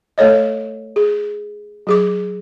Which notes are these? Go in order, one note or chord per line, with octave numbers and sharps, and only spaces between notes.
A3 A4 C#5 D#5
G#4
F#3 G#4 D6